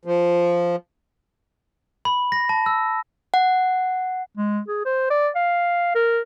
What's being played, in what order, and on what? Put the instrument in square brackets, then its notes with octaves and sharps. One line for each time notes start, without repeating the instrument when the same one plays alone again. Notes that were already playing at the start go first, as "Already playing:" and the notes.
[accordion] F3
[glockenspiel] B5
A#6
A5
E6
[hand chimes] F#5
[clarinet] G#3
G#4
C5
D5
F5
A#4